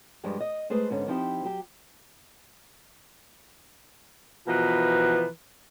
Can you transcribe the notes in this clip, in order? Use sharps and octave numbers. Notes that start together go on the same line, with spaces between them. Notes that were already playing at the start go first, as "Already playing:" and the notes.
G2 F3 G3 G#3 G4
D#5
G#3 A3 G#4 B4 C5
G#2 D3 B3 C#4
F3 B3 C4 D#4 E4 G4
F#3 G4
B2 E3 F3 A#4 B4